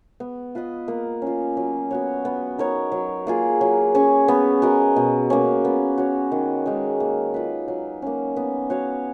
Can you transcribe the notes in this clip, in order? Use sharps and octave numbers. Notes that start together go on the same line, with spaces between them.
B3
F4 B4 D#5
A#3
C#4 F4
F#3
B3 F#4 C#5
B3
D#4 A#4 C#5
F#3
A#3 F4 G#4
F#3
C#4 G#4 C#5
B3
F#4 A#4 D#5
B2
A#3 C#4
B3
F#4 C#5
D#3
G#3 D#4 A#4
A#3
F4 B4
F#3
A#3 C#4
B3
F#4 C#5 F5